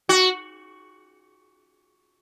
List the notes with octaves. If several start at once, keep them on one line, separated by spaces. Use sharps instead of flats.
F#4